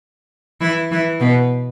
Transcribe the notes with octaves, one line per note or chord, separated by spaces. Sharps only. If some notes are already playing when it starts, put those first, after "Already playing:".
E3 E4
E3 E4
B2 B3